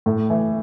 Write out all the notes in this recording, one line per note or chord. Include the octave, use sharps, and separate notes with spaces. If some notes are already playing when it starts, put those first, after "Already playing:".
A2
E3